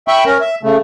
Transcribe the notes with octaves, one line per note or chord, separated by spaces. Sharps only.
E5 G5 B5 C#6
C#4 A#4
E5
C#3 A3